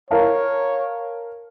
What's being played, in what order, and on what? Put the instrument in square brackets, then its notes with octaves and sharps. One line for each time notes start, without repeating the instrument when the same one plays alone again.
[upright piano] A#4 F5 A5 [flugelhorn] C#5